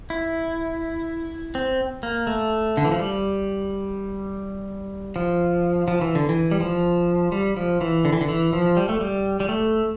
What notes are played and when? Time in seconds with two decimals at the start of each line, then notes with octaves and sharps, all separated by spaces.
0.10 E4
1.55 C4
2.03 A#3
2.27 A3
2.77 D3
2.85 E3
2.92 F3
2.99 G3
5.16 F3
5.88 F3
6.01 E3
6.15 D3
6.29 E3
6.51 G3
6.60 F3
7.32 G3
7.57 F3
7.81 E3
8.05 D3
8.13 E3
8.21 D3
8.29 E3
8.53 F3
8.77 G3
8.89 A3
9.01 G3
9.40 G3
9.49 A3